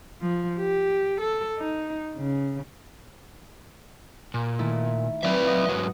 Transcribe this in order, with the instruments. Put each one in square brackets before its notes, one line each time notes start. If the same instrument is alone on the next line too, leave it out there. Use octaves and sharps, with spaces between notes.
[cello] F3
G4
A4
D#4
C#3
[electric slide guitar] A#2
[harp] D#3 A3 E4
[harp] F#3 B4 F5 [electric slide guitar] C4 D5 E5
[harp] D#5 F#5 D#6
[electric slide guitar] G#2 B2 F#3